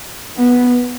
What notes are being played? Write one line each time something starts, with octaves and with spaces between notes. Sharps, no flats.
B3